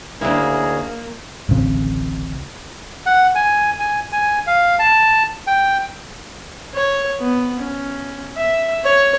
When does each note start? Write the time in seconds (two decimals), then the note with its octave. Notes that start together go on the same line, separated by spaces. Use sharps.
0.21 D2 C#3 A#3 E4 G#4
1.49 D1 A1 C#3 C4
3.06 F#5
3.35 G#5
3.80 G#5
4.12 G#5
4.47 F5
4.79 A5
5.47 G5
6.74 C#5
7.19 B3
7.60 C#4
8.36 E5
8.84 C#5